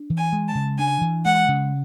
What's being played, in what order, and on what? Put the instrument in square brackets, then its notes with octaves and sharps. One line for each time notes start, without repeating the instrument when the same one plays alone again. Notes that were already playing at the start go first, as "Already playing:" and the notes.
Already playing: [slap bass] D4
E3
[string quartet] G#5
[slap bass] G#3
[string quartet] A5
[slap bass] C#3
[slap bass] D4 [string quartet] G#5
[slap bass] E3
[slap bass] G#3 [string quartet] F#5
[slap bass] C#3